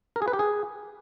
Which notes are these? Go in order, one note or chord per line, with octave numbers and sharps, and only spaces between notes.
A#4
G#4
B4
G4
G#4